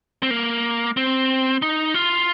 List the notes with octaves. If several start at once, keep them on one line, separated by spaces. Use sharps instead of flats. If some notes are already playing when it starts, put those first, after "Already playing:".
C4
A#3
C4
D#4
F4